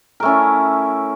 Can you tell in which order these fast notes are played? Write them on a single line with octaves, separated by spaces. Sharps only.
A#4 A3 C#4 E4